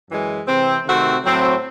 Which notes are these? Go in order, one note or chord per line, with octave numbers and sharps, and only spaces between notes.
F#2 E3 G#3
C3 E3 C4
C3 D#3 A3 C4 F#4
A2 F#3 C4